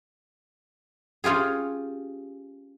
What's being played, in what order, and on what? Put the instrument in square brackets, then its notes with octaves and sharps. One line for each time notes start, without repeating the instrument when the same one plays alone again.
[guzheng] C#4 F4 G4 G#4